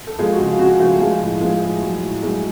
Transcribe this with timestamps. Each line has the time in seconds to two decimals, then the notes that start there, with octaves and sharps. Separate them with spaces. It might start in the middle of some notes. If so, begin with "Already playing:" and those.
0.07 A4
0.19 F3 G#3 G#4
0.32 F#4
0.39 C#3
0.46 F4
0.59 C#3 F#4
0.79 F3 A3 A4
1.00 F3 G#3 G#4
1.21 A2
1.41 F3 G#3 G#4
1.61 A2
1.82 F#3
2.02 A2
2.22 F#3 G#3 G#4